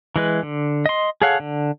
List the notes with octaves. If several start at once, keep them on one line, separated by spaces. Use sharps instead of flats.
E3 G#3 B4
D3
D#5 C6
G#4 A4 C#5 F5 F#5
D3